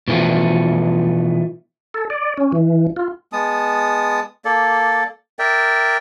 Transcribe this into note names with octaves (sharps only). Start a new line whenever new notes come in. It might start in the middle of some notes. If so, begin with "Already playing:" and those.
B2 E3 F3 A3
A4
D5
C#4
E3
F4
G#3 B3 A5 D#6
A#3 A4 D5
A#4 D5 E5 G5